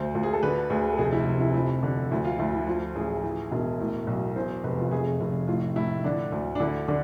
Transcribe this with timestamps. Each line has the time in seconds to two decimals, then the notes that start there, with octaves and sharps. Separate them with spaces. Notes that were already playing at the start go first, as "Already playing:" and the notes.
Already playing: D2 C5
0.14 D2 F4
0.23 G#4
0.33 A4
0.43 D3 B4
0.70 D2 G#4
0.93 A4
0.98 F1 G#4
1.12 E4
1.27 C3
1.41 E4
1.54 F3 E4
1.83 D3
2.11 D2 E4
2.25 F4
2.38 D2 E4
2.53 E4
2.67 F3 F4
2.95 A1 G#4
3.23 E3
3.52 E1
3.80 A2
4.07 B1
4.36 E2 C5
4.64 F1 B4
4.80 F4
4.91 F1 G#4
5.21 F1
5.48 A2 F4
5.76 A2 E4
6.04 D3 D4
6.32 D2
6.55 D4
6.60 D3 E4
6.88 D3 D4